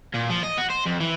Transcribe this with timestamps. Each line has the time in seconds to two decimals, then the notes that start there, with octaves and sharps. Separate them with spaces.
0.14 A#2
0.30 F3
0.43 D#5
0.57 F#4
0.70 C5
0.85 F2
1.00 E3